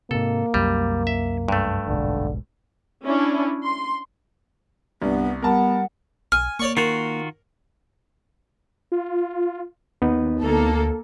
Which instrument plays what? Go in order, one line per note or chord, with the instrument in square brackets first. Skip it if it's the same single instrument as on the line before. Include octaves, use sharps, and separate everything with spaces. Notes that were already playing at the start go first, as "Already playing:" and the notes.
[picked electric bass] G#2 C3 [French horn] A#3 [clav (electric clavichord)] A4
[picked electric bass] C2 F#2 [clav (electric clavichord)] G3
[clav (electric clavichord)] E5
G2 A3
[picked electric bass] F1 B1 G#2 [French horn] D3
[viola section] C#4 D4 E4
C6
[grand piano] C2 [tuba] G2 [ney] B3
[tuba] G3 [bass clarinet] B3 [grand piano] A#4 A5 [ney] F#5
[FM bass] B1 [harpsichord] G#5 [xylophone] F6
[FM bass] A#3 [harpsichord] C#5 D5 C#6
[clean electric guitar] D#3 F4 F#4 [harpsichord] A#4
[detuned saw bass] F4
[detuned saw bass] D#2 [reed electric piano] B3 D#4
[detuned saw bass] D2 [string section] A#3 A4